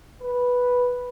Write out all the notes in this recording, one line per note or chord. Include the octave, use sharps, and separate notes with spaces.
B4